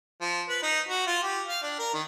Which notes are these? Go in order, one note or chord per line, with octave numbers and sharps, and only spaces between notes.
F3
B4
D#4
F#4
F4
G4
F5
D4
A#4
D#3